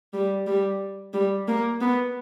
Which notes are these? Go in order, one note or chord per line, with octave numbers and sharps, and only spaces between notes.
G3
G3
G3
A#3
B3